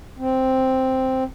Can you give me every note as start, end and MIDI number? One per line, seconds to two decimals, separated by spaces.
0.19 1.24 60